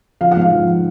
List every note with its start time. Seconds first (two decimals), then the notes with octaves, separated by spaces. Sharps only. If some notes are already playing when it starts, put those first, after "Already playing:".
0.21 F3 F5
0.31 F#5
0.37 G#2 F5
0.52 F3